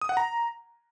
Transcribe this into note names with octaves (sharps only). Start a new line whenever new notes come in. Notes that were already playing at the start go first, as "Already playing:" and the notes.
D#6
F#5
A#5